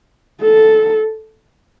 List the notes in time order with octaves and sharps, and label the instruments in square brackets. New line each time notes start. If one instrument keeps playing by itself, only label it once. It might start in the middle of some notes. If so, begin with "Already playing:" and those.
[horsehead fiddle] A4